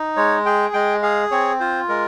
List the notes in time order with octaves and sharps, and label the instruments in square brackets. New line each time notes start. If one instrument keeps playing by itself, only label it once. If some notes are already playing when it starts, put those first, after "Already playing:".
Already playing: [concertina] D#4
G#3 C#5
G#4 G5
G#3 G5
G#4 F5
C4 C#5
F4 C5
G#3 A#4